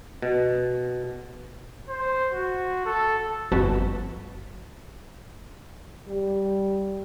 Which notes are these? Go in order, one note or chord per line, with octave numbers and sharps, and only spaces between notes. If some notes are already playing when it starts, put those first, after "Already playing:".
B2
C5
F#4
A4
G1 F2 F#4 B4 A5 B5
G3